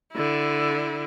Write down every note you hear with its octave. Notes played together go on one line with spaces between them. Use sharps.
D3 E4